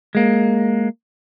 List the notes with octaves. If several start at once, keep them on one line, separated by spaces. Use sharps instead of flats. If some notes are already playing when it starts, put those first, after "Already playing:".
G#3 A#3